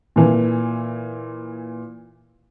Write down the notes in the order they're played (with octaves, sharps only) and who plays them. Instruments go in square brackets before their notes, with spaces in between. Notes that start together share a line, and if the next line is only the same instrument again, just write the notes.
[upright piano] A#2 E3